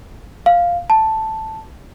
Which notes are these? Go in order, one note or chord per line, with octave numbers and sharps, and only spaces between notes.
F5
A5